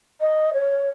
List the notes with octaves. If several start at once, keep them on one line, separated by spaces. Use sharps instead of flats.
D#5
C#5